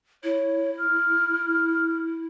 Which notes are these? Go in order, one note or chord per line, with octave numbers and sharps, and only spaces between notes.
E4 C#5
F6